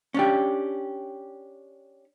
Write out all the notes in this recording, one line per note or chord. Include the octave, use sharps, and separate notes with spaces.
C#4 D4 G4